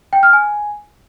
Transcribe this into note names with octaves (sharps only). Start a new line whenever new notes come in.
G5
F6
G#5